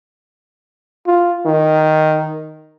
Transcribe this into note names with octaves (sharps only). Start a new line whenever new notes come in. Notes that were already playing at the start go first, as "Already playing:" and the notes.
F4
D#3